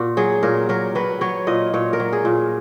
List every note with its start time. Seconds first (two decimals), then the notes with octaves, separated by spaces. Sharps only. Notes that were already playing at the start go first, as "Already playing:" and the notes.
Already playing: A#2 F#4
0.17 F#3 G#4
0.43 A#2 A#4
0.69 F#3 A#4
0.95 F#3 B4
1.21 F#3 C#5
1.47 A#2 D#5
1.74 A#2 C#5
1.93 A#4
2.00 F#3
2.13 G#4
2.25 A#2